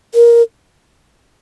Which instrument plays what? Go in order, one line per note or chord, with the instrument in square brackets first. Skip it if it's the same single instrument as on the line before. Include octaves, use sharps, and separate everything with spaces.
[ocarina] A#4